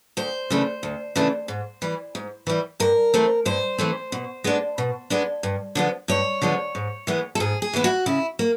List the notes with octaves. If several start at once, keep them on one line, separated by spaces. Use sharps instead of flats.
D2 C5
C#3 E3 A3 D4
D2
C#3 E3 A3 D4
G#2
E3 G3
G#2
E3 G3
G2 A#4
E3 A3 C4
G2 C5
E3 A3 C4
B2
G#3 B3 D4
B2
G#3 B3 D4
G2
D3 F3 G#3 B3
G2 C#5
D3 F3 G#3 B3
G#2
E3 G#3 B3 E4
A4
G#2 G#4
G#4
E3 G#3 B3 E4
F#4
C#3 E4
A#3